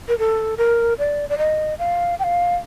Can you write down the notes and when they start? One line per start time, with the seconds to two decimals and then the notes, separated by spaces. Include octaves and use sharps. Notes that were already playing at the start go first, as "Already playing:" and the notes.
0.08 A#4
0.19 A4
0.58 A#4
0.99 D5
1.29 D5
1.38 D#5
1.79 F5
2.19 G5
2.24 F5